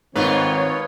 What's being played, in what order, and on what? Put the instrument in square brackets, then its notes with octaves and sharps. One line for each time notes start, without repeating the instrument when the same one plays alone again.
[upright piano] G#2 [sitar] B2 F4 B4 [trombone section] D#3 C4 [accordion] C#5